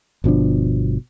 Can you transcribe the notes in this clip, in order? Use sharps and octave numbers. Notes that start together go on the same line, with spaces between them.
G1 B2 F3 D4